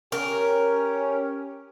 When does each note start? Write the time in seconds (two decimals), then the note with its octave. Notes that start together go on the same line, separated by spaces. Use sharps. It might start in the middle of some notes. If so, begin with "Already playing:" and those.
0.12 C#4 G4 A#4